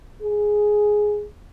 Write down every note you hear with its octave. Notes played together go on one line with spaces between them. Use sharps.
G#4